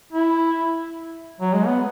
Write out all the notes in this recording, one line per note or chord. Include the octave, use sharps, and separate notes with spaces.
E4
F#3
G#3
B3